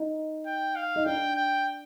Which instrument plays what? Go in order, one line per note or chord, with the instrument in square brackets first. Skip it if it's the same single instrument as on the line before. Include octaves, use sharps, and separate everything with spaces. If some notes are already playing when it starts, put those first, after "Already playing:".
Already playing: [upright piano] D#4
[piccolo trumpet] G5
F5
[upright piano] D#4
[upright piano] D4 [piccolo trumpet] G5
[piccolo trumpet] G5